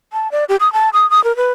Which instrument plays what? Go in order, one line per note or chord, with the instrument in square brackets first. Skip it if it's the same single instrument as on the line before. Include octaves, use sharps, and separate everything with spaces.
[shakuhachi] A5
D5
G4
D#6
A5
D#6
D#6
A#4
B4